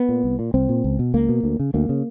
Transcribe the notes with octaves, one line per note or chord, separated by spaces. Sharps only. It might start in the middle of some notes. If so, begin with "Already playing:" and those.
Already playing: B3
A#2
C2
A#2
C2 C4
A#2
C#2
B2
C#2 A#3
B2
D2
C#3
D2 A#3
C#3